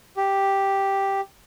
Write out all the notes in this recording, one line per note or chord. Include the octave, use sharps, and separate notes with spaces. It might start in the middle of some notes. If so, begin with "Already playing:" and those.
G4